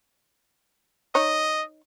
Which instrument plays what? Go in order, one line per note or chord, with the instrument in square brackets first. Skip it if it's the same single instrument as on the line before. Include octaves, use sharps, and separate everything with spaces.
[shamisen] D#4 C#5 [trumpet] D#5